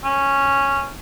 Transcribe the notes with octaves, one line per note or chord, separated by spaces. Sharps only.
C#4